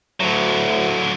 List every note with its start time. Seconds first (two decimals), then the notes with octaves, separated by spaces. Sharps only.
0.20 D2 A2 D3 F#3